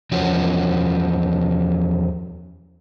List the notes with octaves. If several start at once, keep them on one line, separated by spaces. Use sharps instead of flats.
E2 F3 C#4 F#4